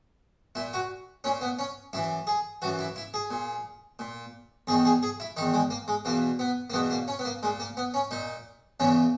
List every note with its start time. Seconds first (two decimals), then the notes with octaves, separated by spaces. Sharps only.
0.55 A#2 E4
0.74 F#4
1.24 A#2 C#4
1.41 B3
1.59 C#4
1.93 F#2 E3 E4
2.27 G#4
2.62 F#2 E3 F#4
2.79 E4
2.96 E4
3.14 G#4
3.31 A#2
3.99 A#2
4.67 E2 D#3 G#4
4.85 G#4
5.03 G#4
5.20 E4
5.37 D#3 D#4
5.41 E2
5.54 G#3
5.70 A#3
5.88 G#3
6.05 E2 B2 A#3
6.39 B3
6.70 A#3
6.73 E2 B2 B3
6.91 A#3
7.08 C#4
7.19 B3
7.25 A#3
7.43 A#2 G#3
7.60 A#3
7.77 B3
7.94 C#4
8.11 A#2 D#4
8.80 E2 C#3 E3 C#4